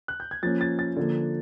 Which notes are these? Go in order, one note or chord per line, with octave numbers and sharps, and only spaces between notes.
F#6
G6
G#6
F3 A#3 C#4 A6
A6
A6
D3 F3 A#3